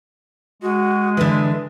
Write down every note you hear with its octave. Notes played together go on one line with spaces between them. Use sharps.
G#3 F#4
D3 E3 B4